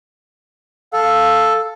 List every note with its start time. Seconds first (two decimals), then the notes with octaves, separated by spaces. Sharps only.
0.94 A4 F5